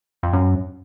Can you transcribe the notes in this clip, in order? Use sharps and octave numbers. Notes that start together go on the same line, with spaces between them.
F2
F#2